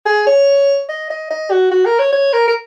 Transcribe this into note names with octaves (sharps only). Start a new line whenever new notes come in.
G#4
C#5
D#5
D#5
D#5
F#4
F#4
A#4
C#5
C#5
A#4
A#4